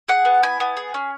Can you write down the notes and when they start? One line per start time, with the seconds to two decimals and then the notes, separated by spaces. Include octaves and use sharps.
0.08 G#4 F#5
0.25 B3
0.43 E4 G#5
0.60 B3
0.77 G#4
0.94 C#4